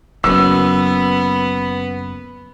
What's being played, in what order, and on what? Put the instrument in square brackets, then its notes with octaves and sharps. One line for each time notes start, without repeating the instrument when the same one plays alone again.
[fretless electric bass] F#1 F#2 [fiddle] B3 [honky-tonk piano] E6